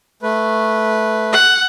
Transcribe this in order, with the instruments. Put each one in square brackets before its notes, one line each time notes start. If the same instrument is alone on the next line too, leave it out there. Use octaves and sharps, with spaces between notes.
[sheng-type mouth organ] A3 B4
[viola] F#5